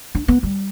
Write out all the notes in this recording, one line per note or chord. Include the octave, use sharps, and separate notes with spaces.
D4
B3
G3